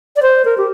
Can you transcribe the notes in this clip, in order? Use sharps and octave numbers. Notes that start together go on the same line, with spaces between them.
D5
C5
A#4
G4